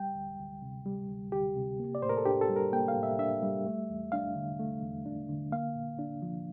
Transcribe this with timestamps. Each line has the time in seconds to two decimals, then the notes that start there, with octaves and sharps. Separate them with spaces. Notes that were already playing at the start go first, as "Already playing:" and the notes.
Already playing: G3 G5
0.15 D2
0.39 D2
0.62 C3
0.86 G3
1.09 D2
1.32 D2 G4
1.55 C3
1.80 A#3
1.95 D5
2.02 A2 C5
2.09 A#4
2.17 A4
2.26 D4 G4
2.41 A4
2.49 G3
2.56 A#4
2.73 A#3 G5
2.88 F5
2.96 A2
3.03 E5
3.19 D4 E5
3.42 G3
3.66 A3
3.89 E2
4.12 D4 F5
4.35 D3
4.60 A3
4.83 E2
5.06 D4
5.29 D3
5.52 A#3 F5
5.75 A#2
5.99 D4
6.22 F3